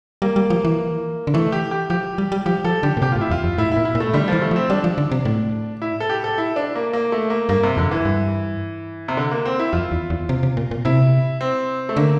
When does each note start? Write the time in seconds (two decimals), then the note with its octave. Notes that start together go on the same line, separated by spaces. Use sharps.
0.22 G3 A#3
0.36 G3
0.50 F3
0.65 E3
1.27 D3
1.34 E3 A3
1.52 G4
1.71 G4
1.90 F3 G4
2.18 G3
2.32 G3
2.46 F3 G4
2.64 F3 A4
2.83 D3 G4
2.97 A#2
3.02 C3 G4
3.12 A2 F4
3.21 E4
3.30 E2 F4
3.44 F2
3.58 A2 E4
3.72 E4
3.77 A#2
3.85 E4
3.95 A#2
4.00 A3
4.14 D3 G3
4.28 E3 F3
4.42 A3
4.51 F3
4.56 C4
4.70 G3 D4
4.84 F3
4.98 D3
5.11 C3
5.25 A2
5.82 E4
6.00 A4
6.10 G4
6.24 A4
6.38 E4
6.56 D4
6.75 A#3
6.93 A#3
7.12 A3
7.30 A#3
7.49 G2 A#3
7.63 C3
7.77 F2 D3
7.91 E3
8.05 G2
9.08 C3
9.17 D3
9.31 A#3
9.46 C4
9.60 E4
9.72 F2 F4
9.92 E2
10.10 E2
10.29 C3
10.43 C3
10.57 A#2
10.71 A#2
10.85 C3 E4
11.41 C4
11.89 A3
11.97 D3 A#3